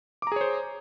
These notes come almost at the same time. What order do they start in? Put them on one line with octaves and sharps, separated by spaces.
D6 A#5 G#4 C#5 C5